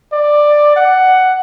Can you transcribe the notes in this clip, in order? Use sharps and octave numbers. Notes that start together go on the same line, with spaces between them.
D5
F#5